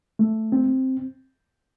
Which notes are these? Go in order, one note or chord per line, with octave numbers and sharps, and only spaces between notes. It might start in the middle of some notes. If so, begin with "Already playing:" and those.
A3
C4